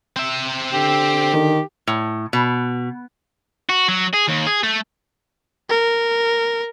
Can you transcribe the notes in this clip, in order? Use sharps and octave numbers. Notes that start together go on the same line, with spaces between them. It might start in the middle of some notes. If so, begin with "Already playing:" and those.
C4 E5
D3 G4
D#3
A2
B2
F#4
F#3
G#4
D#2
G#4
A3
A#4